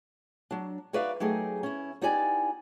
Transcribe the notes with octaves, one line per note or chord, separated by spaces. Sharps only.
F#3 D4
D#4 F#4 B4 D5 E5 F5
F#3 A3 D#4 G4 G#4
C#4 E4
B3 D#4 E4 G4 D5 G#5